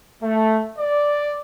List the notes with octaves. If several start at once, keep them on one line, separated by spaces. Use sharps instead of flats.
A3
D5